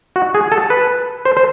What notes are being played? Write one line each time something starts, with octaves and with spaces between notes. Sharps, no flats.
F#4
G#4
A4
B4
C5
C5